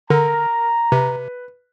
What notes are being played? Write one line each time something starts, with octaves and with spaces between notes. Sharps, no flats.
D3 A#4 A#5
C3 B4